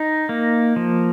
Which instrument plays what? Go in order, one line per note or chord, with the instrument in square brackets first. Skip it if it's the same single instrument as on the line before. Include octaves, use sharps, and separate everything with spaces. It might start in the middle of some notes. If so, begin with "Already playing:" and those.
Already playing: [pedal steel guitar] D#4
A#3
F3